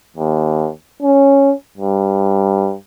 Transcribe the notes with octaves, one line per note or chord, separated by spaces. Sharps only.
D#2
C#4
G2